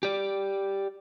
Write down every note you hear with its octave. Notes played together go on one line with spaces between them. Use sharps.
G4 D5